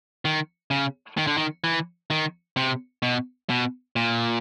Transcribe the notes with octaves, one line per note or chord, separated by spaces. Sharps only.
D#3
C#3
D#3
D3
D#3
E3
D#3
C3
B2
B2
A#2